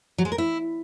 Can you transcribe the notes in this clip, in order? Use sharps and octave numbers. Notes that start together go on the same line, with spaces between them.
F#3
G#3
A#4
E4